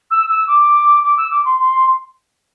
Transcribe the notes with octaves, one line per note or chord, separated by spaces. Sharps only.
E6
E6
D6
D6
E6
D6
C6
C6